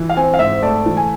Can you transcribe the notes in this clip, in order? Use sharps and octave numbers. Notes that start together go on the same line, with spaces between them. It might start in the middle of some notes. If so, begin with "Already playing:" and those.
Already playing: E3
F5
C4 G#5
F5
G#2 E5
A3 D5
E3
G#5